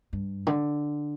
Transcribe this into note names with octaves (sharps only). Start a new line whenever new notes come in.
G2
D3